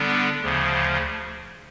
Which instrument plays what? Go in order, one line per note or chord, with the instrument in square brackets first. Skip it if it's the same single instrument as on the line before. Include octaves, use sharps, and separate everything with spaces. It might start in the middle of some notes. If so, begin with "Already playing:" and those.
Already playing: [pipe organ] D3 G3 B3 D4
D2 C#3 F3